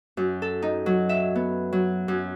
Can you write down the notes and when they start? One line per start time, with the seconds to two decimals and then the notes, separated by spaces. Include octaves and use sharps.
0.17 F#2
0.42 A4
0.62 D#4
0.86 F#3
1.09 E5
1.35 B3
1.73 F#3
2.08 F#2